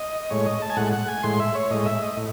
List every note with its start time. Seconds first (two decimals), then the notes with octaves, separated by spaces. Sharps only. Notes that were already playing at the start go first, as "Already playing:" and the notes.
Already playing: D#5
0.31 A2 G#3 C#5
0.46 D#5
0.62 A5
0.70 G#5
0.77 A2 G#3 F#5
0.93 F#5
1.08 G#5
1.23 A2 G#3 C6
1.40 E5
1.55 C#5
1.70 A2 G#3 D#5
1.86 E5
2.02 D#5
2.16 A2